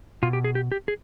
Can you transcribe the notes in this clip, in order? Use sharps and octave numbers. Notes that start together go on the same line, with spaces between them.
B2 F4
G4
G#4
G4
G4
G#4